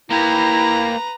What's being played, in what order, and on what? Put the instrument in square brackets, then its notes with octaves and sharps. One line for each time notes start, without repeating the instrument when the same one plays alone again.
[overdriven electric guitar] A#3 G4 [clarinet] E4 [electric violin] B4 A#5